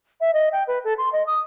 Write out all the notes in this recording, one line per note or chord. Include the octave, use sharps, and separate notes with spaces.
E5
D#5
G5
B4
A4
C6
D#5
D#6